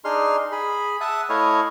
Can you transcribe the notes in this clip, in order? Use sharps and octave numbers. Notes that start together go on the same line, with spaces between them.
D4 D#4 G#4 C6 F6
G#4 B5
E5 F#5 A5 D#6 F#6
A3 E4 C#5 D#5 F5 G#5